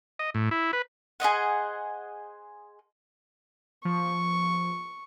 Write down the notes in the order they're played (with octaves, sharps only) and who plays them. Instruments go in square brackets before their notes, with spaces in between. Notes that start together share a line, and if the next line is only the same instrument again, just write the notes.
[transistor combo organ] D#5
A2
E4
B4
[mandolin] G#4 C5 D#5 F#5
[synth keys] F3 [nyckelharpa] C#6